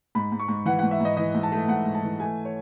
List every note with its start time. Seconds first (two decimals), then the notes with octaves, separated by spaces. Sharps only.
0.15 G#2 B5
0.32 G#2
0.40 C#6
0.48 G#2
0.66 E3 F#5
0.79 G#2 F#5
0.91 E5
1.00 G#2 D#5
1.17 E3 D#5
1.35 G#2
1.43 A5
1.52 A3
1.68 G#2 F#5
1.85 G#2
1.95 A5
2.03 E3
2.20 A3 G#5
2.45 C#5